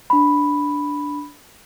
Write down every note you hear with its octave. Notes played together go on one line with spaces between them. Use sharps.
D4 B5